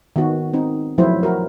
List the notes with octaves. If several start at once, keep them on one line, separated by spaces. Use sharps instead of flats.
D#3 B3 F#4
C4 D#4
F3 F#3 A3 E4 C5
F#4 A#4